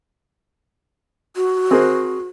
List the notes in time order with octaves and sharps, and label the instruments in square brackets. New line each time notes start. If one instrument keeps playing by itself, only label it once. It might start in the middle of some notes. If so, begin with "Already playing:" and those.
[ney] F#4
[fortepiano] C4 G#4 A#4